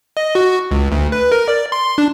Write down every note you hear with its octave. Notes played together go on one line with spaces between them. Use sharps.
D#5
F#4
C#2
D2
B4
A#4
D5
C6
D4